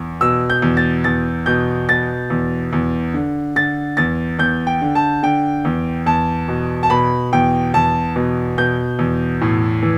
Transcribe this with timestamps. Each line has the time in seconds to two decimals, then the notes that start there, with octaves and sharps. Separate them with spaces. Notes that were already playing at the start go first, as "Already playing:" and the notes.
Already playing: E2
0.21 B2 E6
0.50 G6
0.62 E2
0.77 A6
1.04 E2 A6
1.46 B2 G6
1.89 B2 A6
2.30 E2
2.73 E2
3.14 D3
3.56 D3 A6
3.97 E2 A6
4.39 E2 G6
4.67 G5
4.82 D3
4.95 A5
5.23 D3 G5
5.65 E2
6.06 E2 A5
6.48 B2
6.83 A5
6.90 B2 B5
7.33 E2 G5
7.74 E2 A5
8.16 B2
8.58 B2 G6
8.99 E2
9.41 A2
9.83 E3